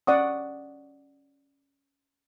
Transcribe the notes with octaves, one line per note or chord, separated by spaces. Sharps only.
C#4 D5 F#5 C#6 D#6